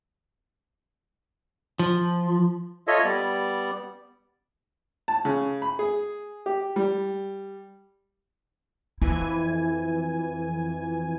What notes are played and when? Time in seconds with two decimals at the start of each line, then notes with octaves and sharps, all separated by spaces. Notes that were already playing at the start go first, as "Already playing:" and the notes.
1.79 F3
2.87 F4 A4 C#5 D#5 E5
3.04 G3 B3 D5
5.08 A5
5.25 C#3
5.62 B5
5.79 G#4
6.46 G4
6.76 G3
9.01 F2 E3 E4 G#5